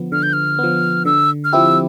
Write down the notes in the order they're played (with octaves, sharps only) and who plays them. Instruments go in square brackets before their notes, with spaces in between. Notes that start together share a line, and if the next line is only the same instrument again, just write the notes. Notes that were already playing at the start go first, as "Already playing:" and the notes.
Already playing: [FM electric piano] D3 F3 B3
[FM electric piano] D3 [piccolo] F6
[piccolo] G6
F6
[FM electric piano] F3 B3
[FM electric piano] D3 [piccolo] E6
[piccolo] F6
[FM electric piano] F3 C4 E4 G4 [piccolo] E6